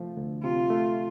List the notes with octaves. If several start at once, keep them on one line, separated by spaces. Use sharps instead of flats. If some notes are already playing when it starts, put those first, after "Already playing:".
Already playing: C3 F3 A3
D2
C3 F4
A3